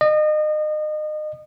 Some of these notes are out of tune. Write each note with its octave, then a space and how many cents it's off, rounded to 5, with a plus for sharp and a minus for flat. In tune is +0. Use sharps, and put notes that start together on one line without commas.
D#5 -30